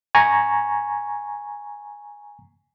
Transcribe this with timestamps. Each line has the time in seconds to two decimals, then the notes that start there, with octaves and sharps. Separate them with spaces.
0.15 G#5 A#5 C#6